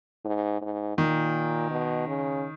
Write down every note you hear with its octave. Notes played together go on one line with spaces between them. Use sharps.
G#2
G#2
A#2 D#3
B2
C#3